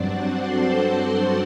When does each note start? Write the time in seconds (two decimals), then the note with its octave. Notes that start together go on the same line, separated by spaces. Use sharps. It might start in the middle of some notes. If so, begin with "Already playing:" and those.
Already playing: G2 F#3 C4 D4 F#4 D5 F#5
0.12 C5 C6
0.42 A4 A5